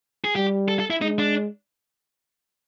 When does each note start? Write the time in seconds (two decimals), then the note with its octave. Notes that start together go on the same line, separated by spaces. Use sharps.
0.24 G#4
0.35 G3 G4
0.68 A4
0.79 A4
0.90 E4
1.01 G#3 D#4
1.19 D4